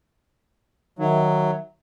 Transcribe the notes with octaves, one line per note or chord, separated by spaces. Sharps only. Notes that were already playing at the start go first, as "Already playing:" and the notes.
D#3 F#3 E5